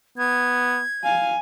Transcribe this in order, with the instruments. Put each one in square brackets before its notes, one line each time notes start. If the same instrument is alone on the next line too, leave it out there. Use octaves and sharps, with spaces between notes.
[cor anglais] B3 [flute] G#6
[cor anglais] F5 [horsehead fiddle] G#5